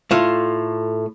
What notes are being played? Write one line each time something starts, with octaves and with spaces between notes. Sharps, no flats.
A2 A3 F4